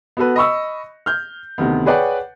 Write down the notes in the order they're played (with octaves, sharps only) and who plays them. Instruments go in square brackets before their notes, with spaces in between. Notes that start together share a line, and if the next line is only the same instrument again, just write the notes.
[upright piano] B3 F#4 A4 B4
D#5 B5 C#6 E6
F6 G6
D2 C3 D#3 B3
G#4 B4 C#5 D5 F#5 G5